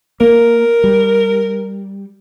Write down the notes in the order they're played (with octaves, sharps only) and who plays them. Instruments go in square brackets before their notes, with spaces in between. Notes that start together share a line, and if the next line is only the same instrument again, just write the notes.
[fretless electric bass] A#3 [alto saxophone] A#4
[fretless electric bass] G3